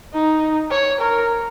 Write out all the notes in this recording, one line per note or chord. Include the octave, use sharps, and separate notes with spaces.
D#4
C#5
A#4